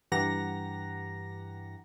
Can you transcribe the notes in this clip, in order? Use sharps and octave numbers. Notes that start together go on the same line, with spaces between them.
G2 E3 G4 F#5 A#5 A#6